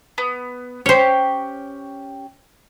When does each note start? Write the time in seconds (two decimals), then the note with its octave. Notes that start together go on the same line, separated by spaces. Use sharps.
0.18 B3
0.86 C#4 G4 C5 C#5